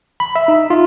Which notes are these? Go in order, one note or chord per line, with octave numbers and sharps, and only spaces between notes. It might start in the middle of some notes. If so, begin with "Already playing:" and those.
B5
E5
D#4
F4